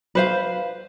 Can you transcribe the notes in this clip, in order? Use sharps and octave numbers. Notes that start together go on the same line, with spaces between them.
B4 C5 F5